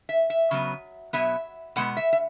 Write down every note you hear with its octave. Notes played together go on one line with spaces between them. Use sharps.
E5
E5
C#3 F#3 B3
B2 F#3 B3 E5
B2 G#3 B3 F#5
E5
E5